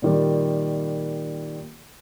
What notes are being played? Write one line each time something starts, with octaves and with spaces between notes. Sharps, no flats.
A#2 D#3 G3